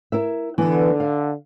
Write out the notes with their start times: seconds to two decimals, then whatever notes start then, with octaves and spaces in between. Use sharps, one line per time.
0.12 E4 A#4 E5
0.58 D3 E3 B3
1.00 F5